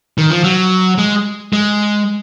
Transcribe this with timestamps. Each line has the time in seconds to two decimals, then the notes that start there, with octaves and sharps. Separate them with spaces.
0.18 D#3
0.30 F3
0.44 F#3
0.98 G#3
1.53 G#3